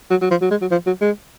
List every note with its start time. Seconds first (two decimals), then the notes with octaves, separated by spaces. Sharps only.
0.10 F#3
0.21 F#3
0.31 F3
0.41 F#3
0.51 G#3
0.61 F#3
0.71 F3
0.87 F#3
1.01 G#3